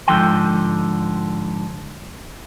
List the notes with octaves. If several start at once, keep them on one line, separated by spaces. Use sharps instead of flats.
G#2 D3 F3 G5 C6